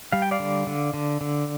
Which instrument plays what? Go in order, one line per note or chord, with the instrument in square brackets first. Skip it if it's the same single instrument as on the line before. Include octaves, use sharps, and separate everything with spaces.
[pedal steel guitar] G3 F5
G5
D5 F5
D3
D3
D3
D3